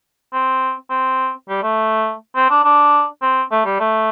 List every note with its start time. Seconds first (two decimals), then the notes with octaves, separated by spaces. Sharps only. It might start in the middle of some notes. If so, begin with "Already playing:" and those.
0.33 C4
0.90 C4
1.48 G3
1.63 A3
2.35 C4
2.50 D4
2.64 D4
3.22 C4
3.51 A3
3.65 G3
3.80 A3